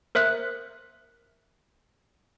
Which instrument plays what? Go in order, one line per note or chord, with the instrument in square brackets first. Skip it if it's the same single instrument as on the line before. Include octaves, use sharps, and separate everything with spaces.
[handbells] A#4 C5 E5 D#6 F#6